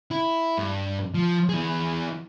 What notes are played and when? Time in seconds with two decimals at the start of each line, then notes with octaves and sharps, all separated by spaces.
0.11 E4
0.58 G2
1.14 F3
1.49 E3 G#4